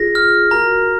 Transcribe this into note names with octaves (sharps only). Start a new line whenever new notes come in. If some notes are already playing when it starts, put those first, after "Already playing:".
Already playing: F4 G#4 A#6
F6
F#4 A#4 A#5